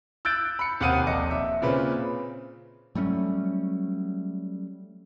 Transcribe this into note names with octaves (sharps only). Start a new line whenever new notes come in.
E6 F#6 G6 A6 D7
B5 C#7
D#2 C3 F5 F#5 D#6 D#7
D#1 A#1 D#5 D6 C#7
E5
A#2 C#3 C4 B4
F#3 G3 A3 C#4